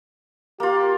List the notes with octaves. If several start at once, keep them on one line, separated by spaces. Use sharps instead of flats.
A#3 F4 G4